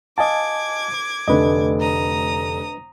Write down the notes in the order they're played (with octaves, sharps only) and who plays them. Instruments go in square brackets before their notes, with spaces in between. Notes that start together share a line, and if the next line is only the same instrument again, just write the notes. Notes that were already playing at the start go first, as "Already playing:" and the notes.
[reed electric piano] D#5 G#5 A5 [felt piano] F5 [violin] D6 G#6
[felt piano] F1 D3 A3 [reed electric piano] D4 B4 D#5
[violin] A#5 D#6